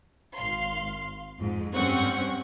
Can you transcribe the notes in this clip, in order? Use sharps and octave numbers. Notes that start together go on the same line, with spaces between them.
G#1 F5 C6
F2 G#2
G2 C4 C#4 F#5 C#6